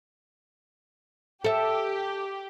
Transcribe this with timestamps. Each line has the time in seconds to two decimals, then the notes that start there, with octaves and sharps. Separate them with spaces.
1.44 G4 A4 E5